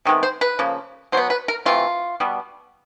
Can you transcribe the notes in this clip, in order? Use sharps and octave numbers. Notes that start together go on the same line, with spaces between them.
C3 D#3 G#3 B3
C5
B4
C#3 F3 A#3
B2 F#3 B3 C5
B4
A#4
C3 E3 A3 F4
B2 G3 B3